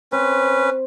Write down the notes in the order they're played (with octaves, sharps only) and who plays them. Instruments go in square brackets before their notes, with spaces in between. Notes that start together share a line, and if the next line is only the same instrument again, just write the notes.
[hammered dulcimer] C4 [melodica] C#4 B4